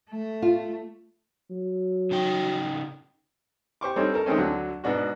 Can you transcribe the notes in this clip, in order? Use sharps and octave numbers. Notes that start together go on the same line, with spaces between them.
A3
F4
F#3
C#3 D#4 G5
G4 C5 C#6 D6
G3 C4 D4 D#4 A4 C#5
A4 A#4
D#3 G#3 A3 C4 C#4
D2 D3 F#3
G#2 B2 D4 F#4